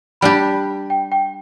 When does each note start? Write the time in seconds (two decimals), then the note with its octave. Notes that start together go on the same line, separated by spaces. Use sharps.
0.21 G3 D4 G4 B5
0.90 G5
1.12 G5